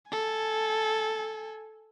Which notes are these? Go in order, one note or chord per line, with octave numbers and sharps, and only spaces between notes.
A4 G#5